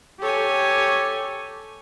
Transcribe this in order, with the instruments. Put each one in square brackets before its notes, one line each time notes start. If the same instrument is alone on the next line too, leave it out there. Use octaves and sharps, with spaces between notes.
[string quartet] G4 A4 C#5 G#5